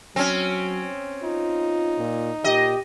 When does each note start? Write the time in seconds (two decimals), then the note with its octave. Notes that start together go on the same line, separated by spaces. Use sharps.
0.16 F#3 C4 C#4
1.24 D#4 F4
1.98 A#2
2.44 A#2 G4 D#5